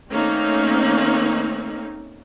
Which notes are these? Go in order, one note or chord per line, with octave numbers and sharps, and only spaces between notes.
D#3 A3 A#3 C4 C#4 D#4